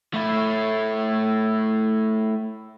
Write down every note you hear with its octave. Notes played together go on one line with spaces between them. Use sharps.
A3 E4